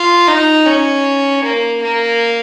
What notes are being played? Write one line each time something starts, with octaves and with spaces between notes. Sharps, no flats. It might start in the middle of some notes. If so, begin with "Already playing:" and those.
Already playing: F4
D#4
C#4
A#3
A#3